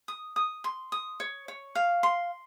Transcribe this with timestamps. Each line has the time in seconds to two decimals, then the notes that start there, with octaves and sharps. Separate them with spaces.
0.08 D#6
0.36 D#6
0.64 C6
0.92 D#6
1.20 C#5
1.48 C#5
1.75 F5
2.03 C6